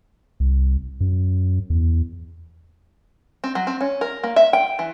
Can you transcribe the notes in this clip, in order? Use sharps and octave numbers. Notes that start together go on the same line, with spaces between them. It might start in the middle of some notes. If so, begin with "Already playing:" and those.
C2
F#2
E2
C4
F#3
C4
C#4
A#4
A#3
E5
G5
E3